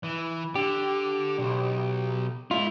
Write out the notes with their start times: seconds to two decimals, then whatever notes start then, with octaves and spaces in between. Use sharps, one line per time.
0.03 E3
0.56 D3 G4
1.39 B1
2.51 G#2 E4 F4